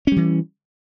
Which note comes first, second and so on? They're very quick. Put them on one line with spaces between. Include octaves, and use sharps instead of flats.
C#4 G3 E3